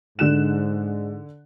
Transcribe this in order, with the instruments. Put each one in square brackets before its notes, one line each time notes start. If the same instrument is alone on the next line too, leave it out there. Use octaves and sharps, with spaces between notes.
[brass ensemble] G#2 [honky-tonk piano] D3 F#6 E7